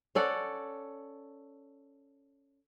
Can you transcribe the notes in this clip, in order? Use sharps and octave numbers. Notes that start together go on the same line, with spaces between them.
C#4 A4 D5 F#5